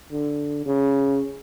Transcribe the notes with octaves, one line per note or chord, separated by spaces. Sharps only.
D3
C#3